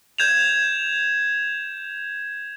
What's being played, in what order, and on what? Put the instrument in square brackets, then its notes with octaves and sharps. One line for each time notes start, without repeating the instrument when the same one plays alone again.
[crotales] G6 G#6 E7 F7